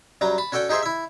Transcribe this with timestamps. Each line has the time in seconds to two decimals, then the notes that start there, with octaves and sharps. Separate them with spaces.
0.21 F#2 F#3 G3 A#5
0.38 A5 B5
0.52 C#4 F#4 A4 D5 G5
0.69 D#4 G4 G#4 C5 E5
0.83 E4 E5